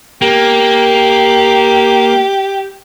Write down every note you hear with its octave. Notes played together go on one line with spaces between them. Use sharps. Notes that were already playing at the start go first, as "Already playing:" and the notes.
A#3 G4